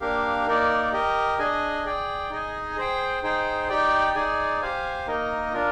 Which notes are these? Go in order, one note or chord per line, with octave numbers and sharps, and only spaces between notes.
A#3 D4 G4 A#4 F5
A#3 D#4 A#4 D5
G4 A#4 D#5
D4 G#4 D#5 G#5
G#4 D5 G5
D#4 G#4 D#5 G#5
G#4 C5 G5
D#4 G#4 C5 G5
D#4 G4 D5 G5
D#4 G#4 D5 G#5
G4 C5 F5 G#5
A#3 D#4 A#4 D#5
D4 F4 A#4